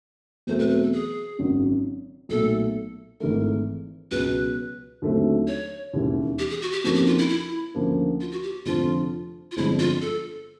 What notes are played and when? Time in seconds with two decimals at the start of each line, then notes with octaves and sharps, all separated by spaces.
0.47 E2 B2 F#3 A3 C4 C5
0.59 B4
0.70 B4
0.82 A4
0.93 G#4
1.38 G#1 F#2 C#3
2.29 B1 A#2 F#3 A3 A4
3.20 G#1 G#2 E3 A3 A#4
4.11 C#2 B2 F#3 B4
5.02 D#2 D3 F#3 A3 C4
5.48 C#5
5.93 E1 D#2 C#3 E3 G3
6.39 G4
6.50 G#4
6.62 F#4
6.72 G4
6.84 F2 C#3 F3 A#3 D#4 F#4
6.95 G4
7.07 F4
7.18 E4
7.29 E4
7.75 D2 C#3 F3 A#3
8.21 F4
8.32 F#4
8.43 G4
8.66 F1 F2 D3 F3 F4
9.51 F4
9.57 G1 F2 D3 F3 G#3 E4
9.79 F4
10.02 A4